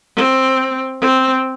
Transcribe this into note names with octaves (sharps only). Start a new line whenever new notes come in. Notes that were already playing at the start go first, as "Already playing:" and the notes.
C4
C4